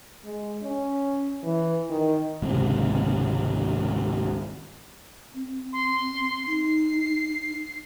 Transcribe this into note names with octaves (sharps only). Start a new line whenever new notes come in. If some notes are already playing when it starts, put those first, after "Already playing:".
G#3
C#4
E3
D#3
G#1 C#2 C3
C4
C6
D#4 C7